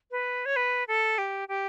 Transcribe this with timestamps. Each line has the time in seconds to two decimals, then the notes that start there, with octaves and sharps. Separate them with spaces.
0.11 B4
0.46 C#5
0.56 B4
0.88 A4
1.18 G4
1.48 G4